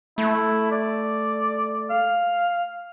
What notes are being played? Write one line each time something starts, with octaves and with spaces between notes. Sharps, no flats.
A3 E4
D5
F5